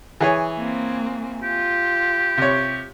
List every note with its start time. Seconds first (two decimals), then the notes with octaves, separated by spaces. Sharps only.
0.21 E3 G#4 C#5
0.58 A#3 C4
1.43 F4 G4
2.37 C3 C#5